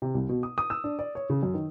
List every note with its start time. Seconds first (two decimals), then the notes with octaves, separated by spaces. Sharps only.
0.02 C3
0.15 C2
0.29 B2
0.43 D#6
0.58 D#6
0.70 E6
0.84 D4
0.99 D5
1.15 C#5
1.30 C#3
1.43 F#2
1.54 D#3